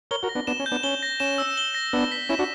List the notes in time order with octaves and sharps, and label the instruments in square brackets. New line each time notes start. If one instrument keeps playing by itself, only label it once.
[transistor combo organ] A#4 C#5 [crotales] G7
[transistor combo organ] F#4 A#4
[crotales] A#6
[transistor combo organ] B3 D4
[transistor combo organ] B3 D4 [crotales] E7
[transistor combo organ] C#4
[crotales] G6
[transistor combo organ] B3 D4
[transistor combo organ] C#4 [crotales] G7
[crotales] A#6
[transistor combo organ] C#4 [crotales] E7
[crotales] E6
G7
A#6
[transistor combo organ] B3 D4 [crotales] E6
[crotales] B6
[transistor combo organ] C#4 E4 [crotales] E7
[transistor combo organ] D4 F#4